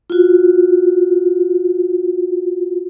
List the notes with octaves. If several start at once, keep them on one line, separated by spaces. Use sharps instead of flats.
F4 F#4